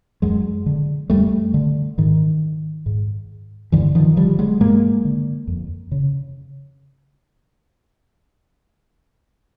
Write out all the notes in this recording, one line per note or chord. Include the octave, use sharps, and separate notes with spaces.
F#2 F#3 G#3
D3
F#2 G3 A3
D3
G#2 D#3
G#2
G2 D3 E3
D#3 F3
D3 F3 G3
F#3 G#3
G2 G#3 A#3
D3
F2
C#3